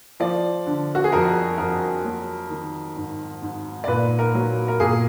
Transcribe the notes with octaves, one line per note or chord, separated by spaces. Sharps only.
F3 D5
D3
F#4
G#4
F2 A#4
F2 A#4
F#3
D#3
G#2
G#2
D5
A#2 B4
A#4
F#3
A#4
A#2 G#4